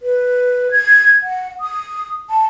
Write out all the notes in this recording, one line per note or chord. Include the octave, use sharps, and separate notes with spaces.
B4
G#6
F#5
D#6
A5